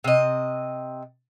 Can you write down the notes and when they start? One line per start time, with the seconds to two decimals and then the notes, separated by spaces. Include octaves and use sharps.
0.04 C3 D#5